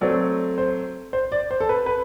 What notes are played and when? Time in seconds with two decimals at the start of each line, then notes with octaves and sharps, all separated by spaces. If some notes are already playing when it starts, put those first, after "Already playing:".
0.01 F#3 A3 C4 D5
0.58 C5
1.13 C5
1.32 D5
1.51 C5
1.60 A4
1.69 B4
1.86 B4